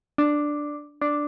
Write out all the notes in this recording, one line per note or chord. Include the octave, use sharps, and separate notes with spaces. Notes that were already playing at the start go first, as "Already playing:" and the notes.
D4
D4